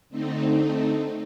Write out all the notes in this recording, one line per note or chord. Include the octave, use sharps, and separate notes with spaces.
D3 A3 C4 D#4